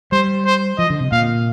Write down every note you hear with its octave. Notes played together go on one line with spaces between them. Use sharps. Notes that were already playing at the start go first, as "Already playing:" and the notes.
G3 C5
C5
F3 D#5
D3
C3
A#2 F5